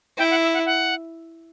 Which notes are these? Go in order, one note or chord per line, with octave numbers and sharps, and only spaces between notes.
E4 G5
F#5
E5
F#5
F#5